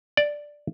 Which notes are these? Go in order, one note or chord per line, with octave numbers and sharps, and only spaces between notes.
D5